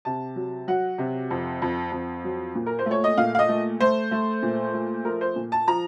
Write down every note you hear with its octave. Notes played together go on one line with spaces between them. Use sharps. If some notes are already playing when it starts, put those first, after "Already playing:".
C3 A5
F#3
F#3 F#5
C3
F2
F2
F2
F#3
A#2
A#4
C5
A3
C#5
D#5
A#2 F5
F5
D#5
A3
A3 C5
A3
A#2
A3
F3 A#4
C5
A#2
A5
F3 A#5